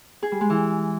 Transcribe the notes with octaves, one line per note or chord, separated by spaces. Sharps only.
G#4
G3
G#3
E3